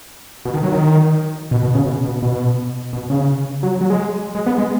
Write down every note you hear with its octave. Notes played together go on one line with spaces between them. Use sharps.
B2
D#3
F#3
D#3
B2
B2
C#3
B2
B2
B2
B2
C#3
F#3
F#3
G#3
G#3
B3
G#3